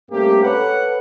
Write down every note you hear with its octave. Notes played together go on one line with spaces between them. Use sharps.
G2 A3 A#3 C4 C#4 G4
A4 B4 C#5 F#5